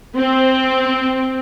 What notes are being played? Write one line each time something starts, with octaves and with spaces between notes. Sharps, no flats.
C4